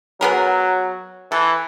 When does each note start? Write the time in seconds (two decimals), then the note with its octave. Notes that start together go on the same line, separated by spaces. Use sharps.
0.21 F#3 B3 G#4 A#4
1.32 E3 A4